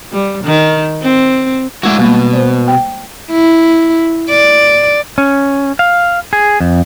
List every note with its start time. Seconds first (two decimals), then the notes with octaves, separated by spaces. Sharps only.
0.13 G3
0.44 D#3
1.02 C4
1.83 G#3 A3 D4 E4 F#4
1.99 B2 G3 A#3
2.33 C5 D5
2.68 G5
3.31 E4
4.30 D5
5.18 C#4
5.79 F5
6.33 G#4
6.60 F2